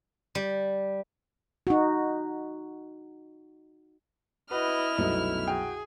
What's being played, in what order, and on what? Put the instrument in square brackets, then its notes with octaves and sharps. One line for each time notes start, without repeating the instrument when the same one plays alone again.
[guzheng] G3
[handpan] D#4 F#4
[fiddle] E4 F6 [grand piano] F#4 B4 [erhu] D#5
[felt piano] C2 F#2 B2 [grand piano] A3 B3 D#4
[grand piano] F#4 G5 [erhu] G#4